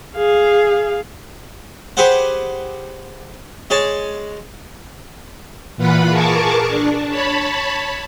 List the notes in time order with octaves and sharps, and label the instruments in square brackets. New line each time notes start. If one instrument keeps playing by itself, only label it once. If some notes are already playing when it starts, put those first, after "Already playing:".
[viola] G#4 F5
[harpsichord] G4 G#4 B4 C5 F#5
G#3 G#4 C#5 A5
[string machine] A#2 E3 F4 B4 F#5 B5
G#4 A#4 A5 C#6 D6
D4
C#5 A5 B5